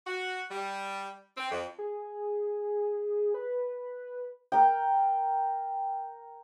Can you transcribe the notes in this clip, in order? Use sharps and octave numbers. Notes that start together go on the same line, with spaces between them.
F#4
G3
C4
F2
G#4
B4
A#4 G5